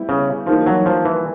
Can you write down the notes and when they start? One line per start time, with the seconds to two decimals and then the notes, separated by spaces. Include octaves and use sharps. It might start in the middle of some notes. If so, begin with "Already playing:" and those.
Already playing: G3 B3 E4 G4
0.09 C#3
0.46 E3 F3 G3 A#3 D#4
0.66 F#3
0.86 F3
1.05 E3